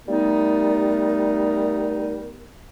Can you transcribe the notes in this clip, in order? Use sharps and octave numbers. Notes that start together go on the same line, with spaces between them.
G3 A3 B3 D#4 A#4